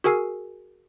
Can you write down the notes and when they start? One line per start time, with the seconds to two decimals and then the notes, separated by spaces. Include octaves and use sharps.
0.04 F#4 G#4 A#4 G#5 E6 C7